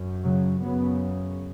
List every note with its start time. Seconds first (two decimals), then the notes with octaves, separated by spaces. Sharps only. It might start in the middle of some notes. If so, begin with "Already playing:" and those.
Already playing: F#2
0.24 C#3 F#3
0.62 F#2 C#3 F#3 B3